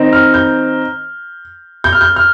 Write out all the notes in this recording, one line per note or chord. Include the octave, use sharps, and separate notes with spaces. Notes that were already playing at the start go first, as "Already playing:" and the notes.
Already playing: D#3 C4 D#4
F6
G6
G6
F6
G6
F6